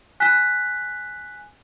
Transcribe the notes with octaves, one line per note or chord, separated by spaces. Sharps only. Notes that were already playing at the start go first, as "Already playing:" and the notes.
G#5 F#6 B6